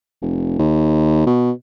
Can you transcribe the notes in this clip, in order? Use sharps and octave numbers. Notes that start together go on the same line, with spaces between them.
F1
D#2
B2